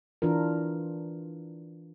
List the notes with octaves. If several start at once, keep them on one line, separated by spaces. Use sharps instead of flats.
E3 D4 F4 A#4